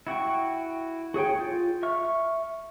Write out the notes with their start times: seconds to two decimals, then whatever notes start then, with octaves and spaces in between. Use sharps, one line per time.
0.07 E4 F#4 G5 C#6
1.14 F#4 G#4 C#5 G5
1.39 F4 G6
1.83 E5 C#6 F6